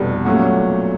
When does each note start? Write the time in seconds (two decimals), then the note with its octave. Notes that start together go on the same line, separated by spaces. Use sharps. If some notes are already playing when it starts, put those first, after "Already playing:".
Already playing: F1 E2 B2 G3
0.25 A#2 F#3 A3 C#4 F#4